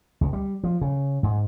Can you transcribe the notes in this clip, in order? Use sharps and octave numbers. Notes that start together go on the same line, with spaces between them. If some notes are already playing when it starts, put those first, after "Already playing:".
C#2
G3
F3
C#3
G#2